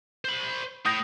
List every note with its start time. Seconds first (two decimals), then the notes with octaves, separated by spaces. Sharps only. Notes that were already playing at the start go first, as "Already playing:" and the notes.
0.25 C5 B5
0.86 A2 D#6 G6 A#6